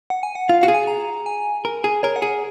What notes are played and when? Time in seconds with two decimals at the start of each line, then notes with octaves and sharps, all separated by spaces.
0.10 F#5
0.23 G#5
0.35 F#5
0.49 F4 F5
0.61 F#4 F5
0.68 G#4
0.74 G#5
0.87 A#5
1.26 G#5
1.65 A#4
1.84 G#4
2.03 A#4 C#5
2.16 F#5
2.22 G#4